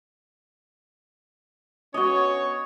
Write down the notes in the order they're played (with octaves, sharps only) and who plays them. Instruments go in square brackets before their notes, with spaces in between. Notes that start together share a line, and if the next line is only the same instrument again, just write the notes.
[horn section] B3 C#4 C#5 [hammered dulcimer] F#4 D#5